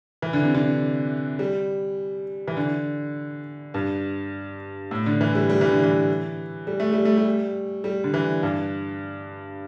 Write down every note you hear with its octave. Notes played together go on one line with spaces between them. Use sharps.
E3
D3
C3
D3
G3
E3
D3
G2
A2
D3
E3
G3
G3
E3
D3
E3
G3
A3
G3
A3
G3
G3
D3
E3
G2